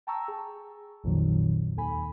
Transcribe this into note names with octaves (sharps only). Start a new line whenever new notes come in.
G5 A5 A#5 C#6 E6
G#4
A#1 F2 A#2 D#3 F#3
D#2 A4 G#5 B5